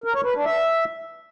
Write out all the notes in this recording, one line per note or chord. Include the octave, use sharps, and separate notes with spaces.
A#4
C#5
B4
D4
E5